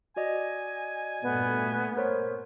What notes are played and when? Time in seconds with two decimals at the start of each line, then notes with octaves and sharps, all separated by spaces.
0.16 F#4 D5 D#5 G#5
1.22 G2 A#2 A3 B3
1.97 A#4 C5 C#5